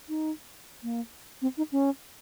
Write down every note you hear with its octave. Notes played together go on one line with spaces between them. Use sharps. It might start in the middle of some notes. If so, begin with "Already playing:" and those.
D#4
A#3
C4
D#4
C#4